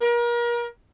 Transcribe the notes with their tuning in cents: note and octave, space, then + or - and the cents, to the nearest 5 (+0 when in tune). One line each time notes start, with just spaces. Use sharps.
A#4 +35